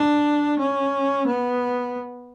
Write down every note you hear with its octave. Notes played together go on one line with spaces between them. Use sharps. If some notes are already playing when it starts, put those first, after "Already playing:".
Already playing: D4
C#4
B3